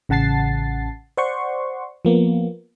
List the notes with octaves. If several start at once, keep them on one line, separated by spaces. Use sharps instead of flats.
A1 C#3 F#5 A5 A6 C7
C5 D5 F#5 C6 C#6
F3 A#3 B3